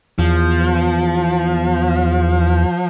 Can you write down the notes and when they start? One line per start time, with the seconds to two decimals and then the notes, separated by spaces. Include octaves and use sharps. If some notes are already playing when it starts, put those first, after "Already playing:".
0.19 E2 F3